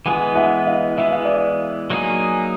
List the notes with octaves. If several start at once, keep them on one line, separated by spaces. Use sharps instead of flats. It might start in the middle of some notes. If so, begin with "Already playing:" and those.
E3 G#3 B3 F#5 G#5
E5 F#5
D#5 F5
E3 G#3 B3 E5
F5
D5 E5
F#3 A#3 D#4 G#4